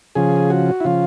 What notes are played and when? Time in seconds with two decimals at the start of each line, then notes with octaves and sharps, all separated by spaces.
0.15 C#3 F3 G#4
0.50 F#4
0.80 E4
0.84 C#3 F3 F4